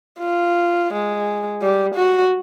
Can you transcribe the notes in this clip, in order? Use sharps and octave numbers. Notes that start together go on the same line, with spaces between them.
F4
G#3
G3
F#4